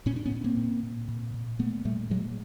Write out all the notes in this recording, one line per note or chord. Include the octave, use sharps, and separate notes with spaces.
A#2 C#4
D4
B3 C#4
A#2
A#3 C4
A#2
A#2
A#2
A#2
A#2 A3 B3
A#2 G3 A3
A#2 F#3 G#3